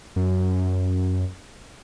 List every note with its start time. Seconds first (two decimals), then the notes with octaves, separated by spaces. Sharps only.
0.16 F#2